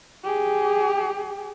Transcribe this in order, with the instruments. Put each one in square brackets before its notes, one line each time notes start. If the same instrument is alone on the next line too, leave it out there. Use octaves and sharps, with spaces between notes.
[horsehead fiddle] G4 G#4